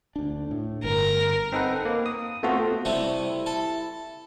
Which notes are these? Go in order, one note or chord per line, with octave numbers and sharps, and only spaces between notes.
D2 D4
A2
G1 A#4
C4 D#4 A4 B4 F#5
A#3
D#6
A3 B3 C4 F4 F#4 A4
C3 G3 A3 E4
A4